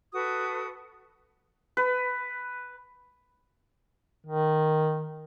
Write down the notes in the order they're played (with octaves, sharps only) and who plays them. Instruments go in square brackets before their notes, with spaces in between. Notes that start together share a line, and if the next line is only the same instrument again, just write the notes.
[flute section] F#4 A4 B4 D#6
[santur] B4
[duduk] D#3